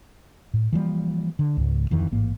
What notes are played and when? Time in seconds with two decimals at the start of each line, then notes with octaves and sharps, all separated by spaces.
0.54 A2
0.73 E3 F3 G3 A#3
1.39 D3
1.57 C#2 G#2
1.90 D1 F2 D#3 E3
2.12 A1 G#2 A#3